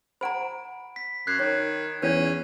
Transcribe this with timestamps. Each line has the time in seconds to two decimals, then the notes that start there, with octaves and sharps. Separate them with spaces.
0.21 C5 F#5 A#5 B5 D7
0.96 B6
1.27 F#2 F#6 G#6 C7
1.39 D#3 C#5
2.02 E2 C#4 B4 C#5 D5